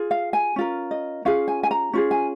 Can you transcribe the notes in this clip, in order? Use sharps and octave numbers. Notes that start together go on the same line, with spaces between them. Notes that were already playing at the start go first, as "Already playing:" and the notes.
Already playing: F4 G#4
F5
G#5
C#4 F4 A#4
D#5
C#4 F4 G#4 F5
G#5
G#5
A#5
C#4 F4 G#4
G#5